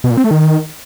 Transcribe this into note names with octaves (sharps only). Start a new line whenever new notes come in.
B2
A#2
C4
A3
D#3